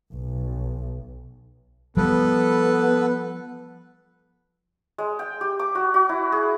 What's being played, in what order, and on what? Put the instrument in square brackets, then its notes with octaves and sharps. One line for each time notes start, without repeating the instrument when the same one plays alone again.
[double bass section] B1
[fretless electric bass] F3 G3 [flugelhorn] B3 [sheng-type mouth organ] A4 B4
[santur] G#3
G5
G4
D6
F#4
F#4
E4
G#4